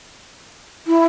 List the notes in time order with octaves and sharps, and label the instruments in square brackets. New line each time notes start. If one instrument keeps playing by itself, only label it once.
[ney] E4